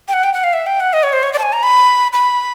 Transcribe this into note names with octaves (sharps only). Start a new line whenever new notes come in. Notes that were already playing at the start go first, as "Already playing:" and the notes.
G5
F#5
G5
F#5
F5
E5
G5
F#5
D#5
C#5
C5
C#5
D5
A5
G#5
A#5
B5
B5